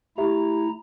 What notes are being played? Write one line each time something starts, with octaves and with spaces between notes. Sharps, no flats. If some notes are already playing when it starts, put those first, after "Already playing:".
A3 E4 G4 E5 A#5